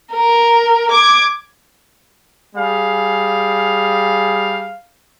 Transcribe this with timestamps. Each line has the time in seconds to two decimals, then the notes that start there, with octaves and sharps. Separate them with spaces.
0.13 A#4
0.91 D6 G#6
2.56 G3 G#4 F5